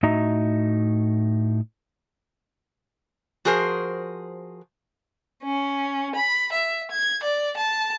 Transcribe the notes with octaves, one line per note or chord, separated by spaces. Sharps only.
A2 D#4 F#4 D#5 E5 A#5
F3 F#4 G#4 A#4 C5
C#4
B5
E5
G#6
D5
A5